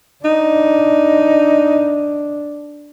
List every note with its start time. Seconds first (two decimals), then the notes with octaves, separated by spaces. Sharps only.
0.25 D4 D#4